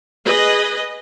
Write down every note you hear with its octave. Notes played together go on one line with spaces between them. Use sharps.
G#4 B4 D#5